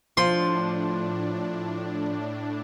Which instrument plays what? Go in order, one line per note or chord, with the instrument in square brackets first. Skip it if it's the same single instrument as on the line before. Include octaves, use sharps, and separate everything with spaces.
[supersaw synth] A2 D4 [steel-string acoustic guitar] F3 [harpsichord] C6